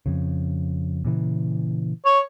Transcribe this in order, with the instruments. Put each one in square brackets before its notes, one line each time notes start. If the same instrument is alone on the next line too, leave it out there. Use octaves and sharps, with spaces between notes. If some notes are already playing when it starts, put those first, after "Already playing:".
[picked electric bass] F2 C#3
A#2 C#3 E3
[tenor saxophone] C#5